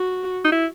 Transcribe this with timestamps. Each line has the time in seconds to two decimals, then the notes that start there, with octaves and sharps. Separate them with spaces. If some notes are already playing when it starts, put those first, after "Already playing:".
Already playing: F#4
0.44 D#4
0.52 E4